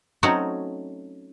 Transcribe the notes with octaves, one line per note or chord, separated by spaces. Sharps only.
F#3 A3 C4 C#4 D#4 F#4